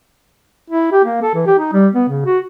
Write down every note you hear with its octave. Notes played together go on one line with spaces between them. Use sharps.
E4
G4
A#3
A4
E3
G4
D#4
G3
B3
C#3
F#4